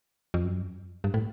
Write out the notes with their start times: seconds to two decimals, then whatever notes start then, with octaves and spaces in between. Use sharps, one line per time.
0.34 F2
0.44 F#2
1.04 G2
1.14 A2